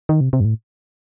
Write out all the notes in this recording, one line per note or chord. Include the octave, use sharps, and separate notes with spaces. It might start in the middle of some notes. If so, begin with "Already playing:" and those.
D#3
C3
C3
G2
A2